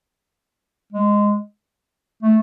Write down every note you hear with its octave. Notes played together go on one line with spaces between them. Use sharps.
G#3
A3